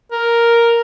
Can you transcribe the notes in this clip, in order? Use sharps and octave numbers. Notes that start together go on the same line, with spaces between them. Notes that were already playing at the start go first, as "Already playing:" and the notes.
A#4